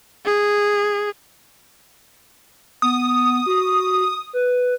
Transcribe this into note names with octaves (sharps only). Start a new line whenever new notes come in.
G#4
B3 D#6
F#4
B4